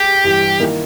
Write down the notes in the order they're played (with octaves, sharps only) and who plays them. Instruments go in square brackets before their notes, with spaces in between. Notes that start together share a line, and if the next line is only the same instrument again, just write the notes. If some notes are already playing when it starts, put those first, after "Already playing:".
Already playing: [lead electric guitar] G4 [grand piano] G#4
[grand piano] G2 E3 G3
D#3 A#3 E4